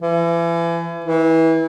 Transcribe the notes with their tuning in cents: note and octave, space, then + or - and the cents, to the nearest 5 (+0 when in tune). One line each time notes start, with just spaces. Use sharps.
E3 +35
E3 -25